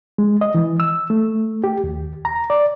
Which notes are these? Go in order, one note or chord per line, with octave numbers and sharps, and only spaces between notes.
G#3
D#5
E3
E6
A3
G4
D#2
A#5
D5